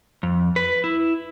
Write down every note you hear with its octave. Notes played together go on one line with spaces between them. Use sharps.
F2
B4
E4